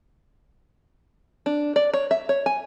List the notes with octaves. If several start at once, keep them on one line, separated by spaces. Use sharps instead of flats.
D4
D5
C#5
E5
C#5
G#5